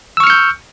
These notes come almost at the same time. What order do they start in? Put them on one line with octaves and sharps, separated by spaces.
E6 C#6 F6 C#7 G6